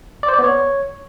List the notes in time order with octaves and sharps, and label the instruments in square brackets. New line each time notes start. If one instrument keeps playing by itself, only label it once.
[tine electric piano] D5
C5
D5
B3
C#5